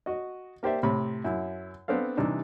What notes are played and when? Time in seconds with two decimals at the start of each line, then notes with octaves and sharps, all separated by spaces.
0.06 F#4 D#5
0.63 A#3 G4 C5 D5 E5
0.83 A2 C3 B5
1.24 F#2 E4
1.88 B3 C4 D4 A4 F5
2.17 C3 E3 G3 D4 D#4